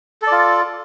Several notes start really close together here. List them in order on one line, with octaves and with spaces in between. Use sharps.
A4 D5 F4